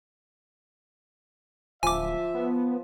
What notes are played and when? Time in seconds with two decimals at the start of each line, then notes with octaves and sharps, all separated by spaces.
1.83 D1 F3 E5 G#5 D6
2.34 B3